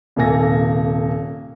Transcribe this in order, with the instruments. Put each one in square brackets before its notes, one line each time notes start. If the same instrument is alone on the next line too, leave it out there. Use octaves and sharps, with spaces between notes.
[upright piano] D#1 C3 A#3 A4 G#5 A#6